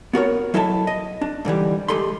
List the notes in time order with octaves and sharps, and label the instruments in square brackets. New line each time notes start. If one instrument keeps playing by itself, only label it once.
[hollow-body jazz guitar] B3 F#4 A#4 C#5
F#3 E4 A4 D#5 E5 A5
D#5
D4
G#2 D3 E3 G3
G#3 G4 A4 B5 C6